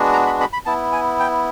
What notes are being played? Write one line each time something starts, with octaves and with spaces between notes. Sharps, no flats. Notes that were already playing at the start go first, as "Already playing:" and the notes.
Already playing: G#3 B3 D4 F#4
A#5
B5
B5
B5
B3 E4 A5
G#5
G5